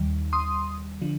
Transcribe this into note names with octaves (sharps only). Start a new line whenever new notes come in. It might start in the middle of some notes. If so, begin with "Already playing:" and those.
Already playing: D#2 D#3 G3
C6 D#6
D3 F3